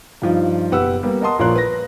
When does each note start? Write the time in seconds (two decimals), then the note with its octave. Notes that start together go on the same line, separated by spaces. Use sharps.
0.22 G2 F3 D#4
0.71 F#1 B2 G4 B4 F#5 E6
1.03 G3 A#3 B3
1.21 A#4 D#5 F#5 A5 C6 D#6
1.39 A#1 F3 A#4 C#5 C6 F#6
1.55 B4 A#6